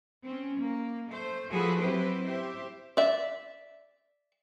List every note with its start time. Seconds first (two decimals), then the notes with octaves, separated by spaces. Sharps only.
0.23 C4 C#4
0.57 A#3
1.09 A3 C5
1.49 F3 A3 F#4 G#4 A4 B4
1.79 F#3 C4 E4 G4 B4 C5
2.24 G4 C5 E5
2.97 D5 E5